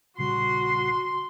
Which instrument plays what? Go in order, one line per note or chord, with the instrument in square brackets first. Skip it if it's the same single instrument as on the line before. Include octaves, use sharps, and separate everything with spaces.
[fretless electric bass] A#1 C#3 G3 [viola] F#4 [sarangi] C6 [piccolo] C7